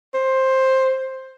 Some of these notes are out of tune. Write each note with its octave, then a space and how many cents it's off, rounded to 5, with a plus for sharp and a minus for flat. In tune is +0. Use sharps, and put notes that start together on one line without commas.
C5 +10